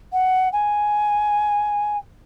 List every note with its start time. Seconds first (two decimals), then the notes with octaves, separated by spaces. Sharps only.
0.12 F#5
0.52 G#5